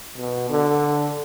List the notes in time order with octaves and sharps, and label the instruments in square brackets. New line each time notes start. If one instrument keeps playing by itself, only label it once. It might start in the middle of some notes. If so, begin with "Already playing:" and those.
[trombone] B2
D3